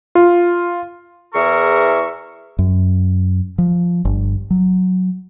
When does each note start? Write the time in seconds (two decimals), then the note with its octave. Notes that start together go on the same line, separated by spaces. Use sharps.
0.15 F4
1.34 E2 E3 G#4 A#4 E5 C#6
2.59 F#2
3.58 F3
4.05 G1
4.50 F#3